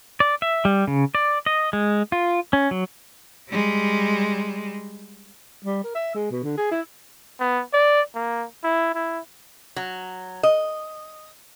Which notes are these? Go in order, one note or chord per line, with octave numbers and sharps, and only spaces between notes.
D5
E5
G3
C#3
D5
D#5
G#3
F4
C#4
F#3
G3 G#3
G3
A#4
E5
G#3
B2
D3
G#4
E4
B3
D5
A#3
E4
E4
F#3
D#5